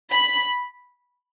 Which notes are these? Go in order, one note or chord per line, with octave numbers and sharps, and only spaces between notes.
B5